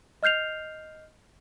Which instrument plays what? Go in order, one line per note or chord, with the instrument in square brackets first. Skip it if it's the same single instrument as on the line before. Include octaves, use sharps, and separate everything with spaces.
[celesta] D#5 F6 G6 C7 F7